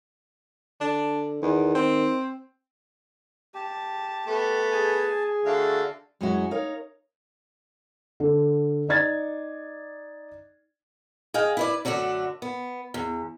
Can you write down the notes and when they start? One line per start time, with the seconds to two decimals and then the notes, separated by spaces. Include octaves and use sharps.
0.81 D3 D4
1.42 E2 D#3
1.75 C4
3.54 G4 A5
4.27 A3 B3
4.72 G#4 G#5 A5
5.45 D3 A3 D4 F#4 F5
6.21 F#2 F#3 G#3 C#4 E4 F#4
6.51 D#4 A#4 C#5 F5
8.20 D3
8.89 D#4 D5 G#6 A6
11.34 G#4 D#5 F5 G5
11.57 E4 B4 D5
11.85 F#2 D3 A3 D4 F#4
12.42 B3
12.94 E2